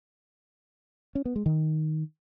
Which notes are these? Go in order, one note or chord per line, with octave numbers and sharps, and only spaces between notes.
C#4
B3
G#3
D#3